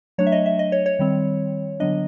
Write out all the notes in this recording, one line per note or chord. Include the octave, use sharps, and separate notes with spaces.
F#3 A3 D4 C#5
E5
D#5
E5
D#5
C#5
C#5
D#3 G3 C4
D3 F#3 B3 D4 D#5